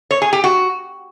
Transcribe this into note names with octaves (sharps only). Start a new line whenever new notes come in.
C#5
G#4
G4
F#4